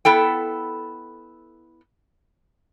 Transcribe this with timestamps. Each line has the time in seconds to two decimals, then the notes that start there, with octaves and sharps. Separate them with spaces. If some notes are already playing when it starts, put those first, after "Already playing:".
0.05 B3 E4 A4 G5